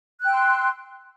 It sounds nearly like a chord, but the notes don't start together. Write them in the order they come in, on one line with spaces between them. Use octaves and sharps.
F#6 G5 E6 C6